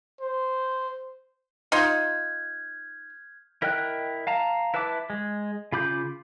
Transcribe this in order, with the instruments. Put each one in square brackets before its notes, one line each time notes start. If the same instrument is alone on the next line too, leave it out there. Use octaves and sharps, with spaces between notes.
[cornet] C5
[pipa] D#4 F4 [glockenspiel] F6 G6 G#6
[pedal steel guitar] E4 A#4 D#5 G5 F#6
F5 A5 A#5
E4 B4 E5 A5 D6
G#3
C#3 F4 B5 D6 G6